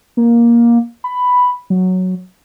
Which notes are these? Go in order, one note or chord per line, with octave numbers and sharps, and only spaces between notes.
A#3
B5
F#3